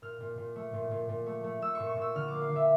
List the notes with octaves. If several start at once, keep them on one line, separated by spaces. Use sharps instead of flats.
A#2 F6
A#2
A#2
A3
A#2
A#2
A#2
A3
A3
A3 E6
A#2 C#6
C#6
A#2 E6
D3 F6
A#3 D6
F5
D3 E5